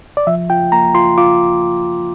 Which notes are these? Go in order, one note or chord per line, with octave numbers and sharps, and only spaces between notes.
D5
F3 E5
F4 G5
A#3 A#5
F4 C6
F4 D6